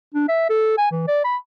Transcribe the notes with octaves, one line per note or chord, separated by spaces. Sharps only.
D4
E5
A4
G#5
E3
D5
B5